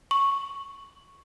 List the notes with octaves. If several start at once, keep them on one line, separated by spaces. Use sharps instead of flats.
C#6